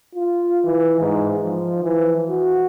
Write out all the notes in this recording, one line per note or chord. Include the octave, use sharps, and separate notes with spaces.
F4
E3
G#2
F3
E3
F#4